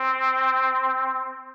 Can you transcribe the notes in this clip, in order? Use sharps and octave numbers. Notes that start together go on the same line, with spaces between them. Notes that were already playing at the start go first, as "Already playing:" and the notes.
Already playing: C4